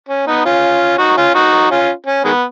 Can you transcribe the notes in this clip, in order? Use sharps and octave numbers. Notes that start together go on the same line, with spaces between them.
C#4
B3 D#4
C#4 F4
D#4 F#4
C#4 F4
D#4 F#4
C#4 F4
C#4
D#3 G#3 B3